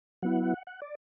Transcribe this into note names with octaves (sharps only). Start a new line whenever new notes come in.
F#3 B3 E4 F#5
F#5
D5